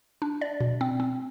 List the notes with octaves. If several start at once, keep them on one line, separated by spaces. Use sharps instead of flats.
D4
D5
B2
C4
C4